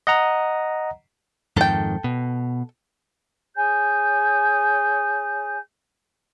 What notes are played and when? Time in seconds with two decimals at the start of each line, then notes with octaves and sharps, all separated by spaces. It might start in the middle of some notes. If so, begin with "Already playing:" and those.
0.07 D#5 F#5 A#5
1.57 F2 G#2 D#3 A4 G5
2.04 B2
3.55 G#4 C#5 G#5 G6